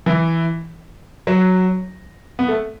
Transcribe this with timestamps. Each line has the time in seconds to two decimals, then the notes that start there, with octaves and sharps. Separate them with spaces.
0.06 E3
1.27 F#3
2.39 B3
2.48 A3